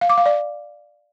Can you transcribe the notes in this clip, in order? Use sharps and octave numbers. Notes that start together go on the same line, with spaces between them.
F5
D6
F5
D5